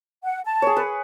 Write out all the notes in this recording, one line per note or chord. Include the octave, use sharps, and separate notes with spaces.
F#5
A5
G#4 C#5
B4